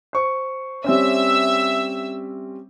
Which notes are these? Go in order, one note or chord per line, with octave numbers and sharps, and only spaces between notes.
C5 C#6
G3 C4 C#4 E5 E6